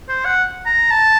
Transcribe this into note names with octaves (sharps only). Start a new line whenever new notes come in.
C5
F#5
A#5
A5